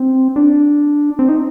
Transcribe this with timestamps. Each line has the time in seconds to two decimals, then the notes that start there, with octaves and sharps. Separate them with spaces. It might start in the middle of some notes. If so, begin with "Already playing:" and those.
Already playing: C4
0.36 D4
1.19 C4
1.29 D#4